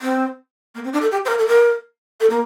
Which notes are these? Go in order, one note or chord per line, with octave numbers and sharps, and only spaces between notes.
C4
A#3
C4
D4
A4
G4
C5
A#4
A4
A#4
A4
A#3